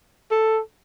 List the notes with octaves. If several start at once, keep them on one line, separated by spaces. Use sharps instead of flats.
A4